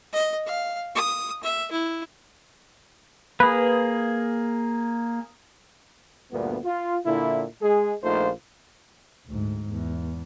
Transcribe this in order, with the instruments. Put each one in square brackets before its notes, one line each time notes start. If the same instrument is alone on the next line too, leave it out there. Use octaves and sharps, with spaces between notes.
[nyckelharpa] D#5
F5
D#6
E5
E4
[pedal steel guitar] A#3 G#4 [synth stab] B4
[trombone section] D2 G2 A#2 B3
F4
A#2 D3 E4
G#3 G#4
A#1 A3 D#4 F4 C5
[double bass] D2 G#2
E2